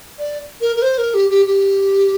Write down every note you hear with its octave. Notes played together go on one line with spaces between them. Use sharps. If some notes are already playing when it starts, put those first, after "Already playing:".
D5
A#4
A#4
C5
A#4
G4
G4
G4